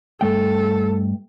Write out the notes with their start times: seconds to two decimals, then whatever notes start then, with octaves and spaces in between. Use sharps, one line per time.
0.21 G2 A3 A4 G5